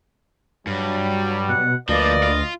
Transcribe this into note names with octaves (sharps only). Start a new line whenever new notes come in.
G2 F#3 G3
B2 F#5
D2 F3 A#3 B4 D5 D#5
F4